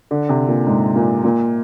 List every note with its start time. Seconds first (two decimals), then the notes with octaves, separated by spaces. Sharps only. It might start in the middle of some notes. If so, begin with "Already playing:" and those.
0.11 D3
0.29 C3
0.48 A#2
0.67 G#2
0.95 A#2
1.24 A#2